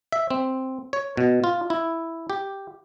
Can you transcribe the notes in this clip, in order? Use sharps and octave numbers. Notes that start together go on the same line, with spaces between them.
E5
C4
C#5
B2
F4
E4
G4